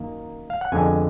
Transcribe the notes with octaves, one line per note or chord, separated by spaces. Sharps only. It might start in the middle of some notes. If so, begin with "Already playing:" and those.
Already playing: F#2 D#3 A#3
F5
F#5
F2 D3 G#3 B3 G#5